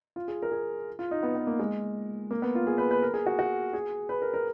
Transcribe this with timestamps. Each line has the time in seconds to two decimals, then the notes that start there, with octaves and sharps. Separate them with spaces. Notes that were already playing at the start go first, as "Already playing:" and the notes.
0.16 F4
0.28 G#4
0.42 A#4
0.52 G#4
0.99 F4
1.11 D#4
1.23 B3
1.35 B3
1.47 A#3
1.60 G#3
2.31 A#3
2.42 B3
2.55 F4
2.67 G#4
2.78 B4
2.91 B4
3.02 A#4
3.14 G#4
3.26 F#4
3.39 F#4
3.73 G#4
4.09 B4
4.22 A#4
4.34 A#4